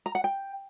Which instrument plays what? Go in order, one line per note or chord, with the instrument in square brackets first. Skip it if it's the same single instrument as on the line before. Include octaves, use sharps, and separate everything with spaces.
[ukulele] A#5
F#5
G5